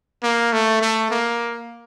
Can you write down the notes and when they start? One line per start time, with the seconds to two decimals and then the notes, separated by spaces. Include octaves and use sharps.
0.23 A#3
0.53 A3
0.82 A3
1.11 A#3